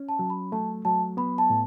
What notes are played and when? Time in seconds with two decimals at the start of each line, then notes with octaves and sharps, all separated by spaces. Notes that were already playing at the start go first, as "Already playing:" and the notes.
Already playing: C#4
0.09 A5
0.19 F#3
0.30 B5
0.52 A3 A5
0.85 F#3 A5
1.17 B3 B5
1.38 A5
1.50 A2